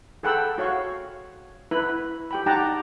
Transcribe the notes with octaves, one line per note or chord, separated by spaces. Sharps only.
G#4 A4 F#5 G5 B5 E6
F#4 C#5 F5 C#6
E4 B4 B5
G4 G5 B5
D#4 G4 F#5 G5 A5 A#5